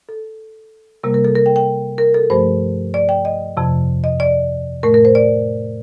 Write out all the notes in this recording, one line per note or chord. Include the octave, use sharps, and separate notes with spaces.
A4
C3 G3 A#3 A#4
A#4
A4
A#4
G5
G5
A#4
A4
G2 F3 A3 C5
D5
G5
D#5
F2 C3 F3
D#5
D5
A2 A3 A#4
A#4
C5
D5